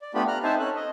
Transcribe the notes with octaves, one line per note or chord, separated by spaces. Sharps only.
D5
A3 B3 D4 F4 G4 B5
A#5 F6 F#6
C4 D#4 C5 E5 G#5 A5
C#4 A4 F#6
D#5